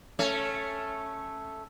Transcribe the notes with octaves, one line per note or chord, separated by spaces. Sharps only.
A3 C#4